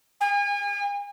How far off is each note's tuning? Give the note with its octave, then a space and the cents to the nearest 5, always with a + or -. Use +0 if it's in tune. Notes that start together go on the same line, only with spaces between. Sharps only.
G#5 -35